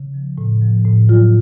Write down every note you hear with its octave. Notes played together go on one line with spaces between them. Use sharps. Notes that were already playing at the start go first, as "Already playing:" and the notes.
Already playing: C#3
F3
A2
F3
A2
F#3 F4